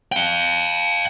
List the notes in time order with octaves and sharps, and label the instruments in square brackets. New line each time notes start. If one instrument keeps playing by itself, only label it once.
[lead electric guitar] F5 G5